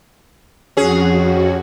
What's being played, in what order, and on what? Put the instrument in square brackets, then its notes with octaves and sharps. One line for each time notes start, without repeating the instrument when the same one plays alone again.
[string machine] F2 F#4 [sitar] C#4 G#4